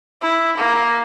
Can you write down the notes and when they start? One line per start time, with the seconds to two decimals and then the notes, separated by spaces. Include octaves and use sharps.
0.21 E4
0.57 A#3